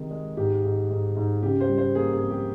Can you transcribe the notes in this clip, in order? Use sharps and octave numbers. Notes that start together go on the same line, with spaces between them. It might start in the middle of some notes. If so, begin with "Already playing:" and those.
Already playing: C3 D#3 G#3
G#3
G#2 G4
G#2
G#2
G#2
C#3 G4
C5
G3
C5
A#3 G#4
G#4
F2
G4